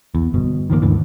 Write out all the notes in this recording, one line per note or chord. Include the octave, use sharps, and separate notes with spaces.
E2
G1 B2
D#3 F3 F#3 A#3
D#2 G#2 D3 E3